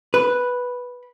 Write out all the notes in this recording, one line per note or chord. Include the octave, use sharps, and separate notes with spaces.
B4